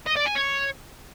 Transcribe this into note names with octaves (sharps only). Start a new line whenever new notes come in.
D#5
D5
G#5
C#5